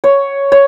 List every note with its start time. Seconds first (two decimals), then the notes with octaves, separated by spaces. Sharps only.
0.04 C#5
0.52 C#5